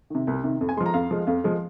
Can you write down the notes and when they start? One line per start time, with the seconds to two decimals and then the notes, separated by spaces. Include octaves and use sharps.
0.10 C3 D#3
0.27 C2
0.44 C3 D#3
0.61 F2
0.69 G#5
0.77 G#3 C6
0.80 F3
0.86 A#5
0.94 F2 F5
1.11 F3 G#3
1.27 F2 F5
1.44 F3 G#3